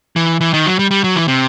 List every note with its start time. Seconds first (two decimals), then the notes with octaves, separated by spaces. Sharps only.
0.16 E3
0.41 E3
0.54 D#3
0.66 F#3
0.79 G3
0.91 G3
1.04 F#3
1.16 E3
1.28 C3